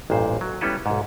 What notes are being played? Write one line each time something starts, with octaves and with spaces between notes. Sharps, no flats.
A1 G2 A#2 C5
F#3
G3 B3 C#4 E4 A4 B4
B1 G#2